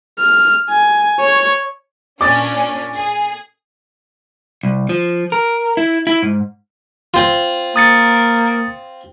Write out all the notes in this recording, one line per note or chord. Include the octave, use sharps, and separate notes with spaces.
F6
G#5
C#5
A#2 C#4 D4 D6 A6
G#4
C2
F3
A#4
E4
E4
G#2
C4 F4
A#3 D#6 A6 C#7